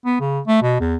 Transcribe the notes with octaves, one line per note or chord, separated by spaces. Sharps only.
B3
C#3
A3
B2
E2